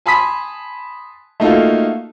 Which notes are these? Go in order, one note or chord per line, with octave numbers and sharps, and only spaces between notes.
G#5 A5 B5 C6 D#6 B6
A3 A#3 D#4 F4 F#4 A4